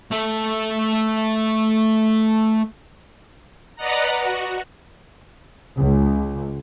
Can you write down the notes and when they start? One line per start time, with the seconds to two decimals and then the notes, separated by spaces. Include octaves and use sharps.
0.12 A3 A4
3.76 B4 D5 D#5 F#5 A#5
4.20 F#4
5.76 C#2